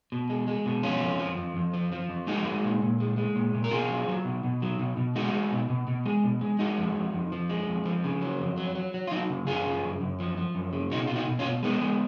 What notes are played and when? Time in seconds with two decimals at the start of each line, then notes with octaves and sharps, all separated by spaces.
0.12 B2
0.30 G#3
0.48 G#3
0.66 B2
0.83 F2 C#4 F4
1.01 F2
1.19 F3
1.37 F2
1.56 F2
1.74 F3
1.92 F3
2.09 F2
2.27 G#3 D#4 F#4
2.46 G#3
2.64 A#2
2.82 A#2
3.00 G#3
3.17 G#3
3.36 A#2
3.54 A#2
3.64 A#4
3.71 B2 F4 G#4
3.89 F#3
4.08 F#3
4.25 B2
4.44 B2
4.62 F#3
4.79 B2
4.97 B2
5.15 G#3 D#4 F#4
5.33 G#3
5.52 B2
5.70 B2
5.88 B2
6.05 G#3
6.24 B2
6.41 G#3
6.59 G#3 D#4 F#4
6.78 F2
6.95 F2
7.14 F2
7.32 F3
7.49 G#3
7.68 F2
7.85 F3
8.04 C#3
8.22 F#3
8.40 F2
8.57 F#3
8.75 F#3
8.94 F#3
9.07 F4
9.11 F#3 D#4 F#4
9.30 C#3
9.47 F#2 F4 G#4
9.66 C#3
9.83 F#2
10.01 F#2
10.20 F3
10.37 F3
10.55 F#2
10.73 C#3
10.91 B2 D#4 F#4
11.07 B2 F4
11.15 D#4 F#4
11.28 B2
11.39 C#4 F4
11.45 B2
11.63 G#3 B3 D#4
11.81 G#3